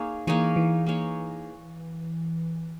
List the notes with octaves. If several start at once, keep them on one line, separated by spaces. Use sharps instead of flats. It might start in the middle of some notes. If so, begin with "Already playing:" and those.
Already playing: A#3 D#4 G#4 C#5
E3 A#3 D#4 G#4 C#5
E3
A#3 D#4 G#4 C#5